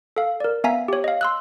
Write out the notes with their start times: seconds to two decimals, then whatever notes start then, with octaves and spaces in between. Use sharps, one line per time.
0.16 A4 F5
0.40 A#4 D5
0.64 B3 E5 F5 G#5 A#5 B6
0.88 G4 C#5
1.04 D#5 F5
1.21 C6 E6 F#6